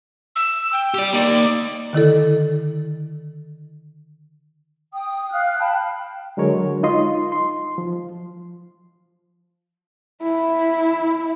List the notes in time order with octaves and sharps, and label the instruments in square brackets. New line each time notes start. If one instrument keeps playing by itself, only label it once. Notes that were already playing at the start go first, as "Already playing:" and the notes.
[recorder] E6
G5
[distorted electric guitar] G4 D5
[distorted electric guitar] A#3 D#4 [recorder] D5
[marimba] D3 D#3 E4 A4
[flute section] G5 D#6
F5 F6 F#6
G5 A5 B5
[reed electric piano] D3 F#3 G#3 A#4 C#5
D#4 F4 D#5 C6
C6
F3
[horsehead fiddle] E4